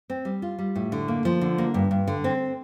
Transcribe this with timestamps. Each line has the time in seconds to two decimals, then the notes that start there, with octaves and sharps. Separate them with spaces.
0.10 C4
0.25 G3
0.42 F4
0.59 G3
0.75 A2
0.92 D3
1.08 A#3
1.25 F3
1.41 D3
1.58 A#3
1.74 G2
1.91 G2
2.08 D3
2.24 C4